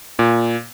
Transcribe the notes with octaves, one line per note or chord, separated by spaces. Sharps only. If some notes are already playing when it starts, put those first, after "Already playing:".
A#2